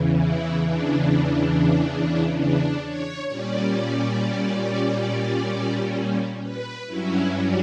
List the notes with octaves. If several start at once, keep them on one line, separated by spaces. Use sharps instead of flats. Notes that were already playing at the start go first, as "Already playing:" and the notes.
Already playing: E2 C#3 E3
E4
D4
D4
C#5
A#2 G3 C#4 D5
B4
G2 F#3 C#4 E4
D4